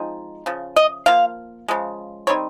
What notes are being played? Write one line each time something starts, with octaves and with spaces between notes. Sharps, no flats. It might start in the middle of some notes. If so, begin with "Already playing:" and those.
Already playing: F3 G#3 C4 D#4
C#3 F3
D#5
F3 A#3 F4 F5
C#3 F3 G#3
D#3 G3 C4 D#4 C#5